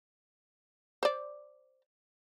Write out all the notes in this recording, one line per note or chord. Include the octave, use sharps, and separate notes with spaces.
C5 D5